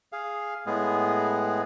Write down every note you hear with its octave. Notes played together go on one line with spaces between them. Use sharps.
G#4 F5
A2 G#3 B3 G#4